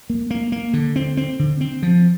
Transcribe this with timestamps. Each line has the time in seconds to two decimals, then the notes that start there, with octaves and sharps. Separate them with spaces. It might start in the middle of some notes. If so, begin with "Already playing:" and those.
0.10 A#3
0.31 A#3
0.52 A#3
0.73 D3
0.96 C4
1.17 C4
1.39 D3
1.61 C4
1.82 F3